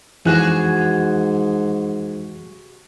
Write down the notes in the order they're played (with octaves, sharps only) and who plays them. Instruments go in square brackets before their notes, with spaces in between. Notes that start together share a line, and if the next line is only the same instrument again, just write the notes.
[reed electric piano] F2 E3 F#6 [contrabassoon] G#2 [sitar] C3 F#4 G#4